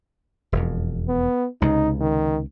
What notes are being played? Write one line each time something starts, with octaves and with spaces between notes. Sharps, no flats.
E1 F2
B3
C#2 C3 D#4
D#3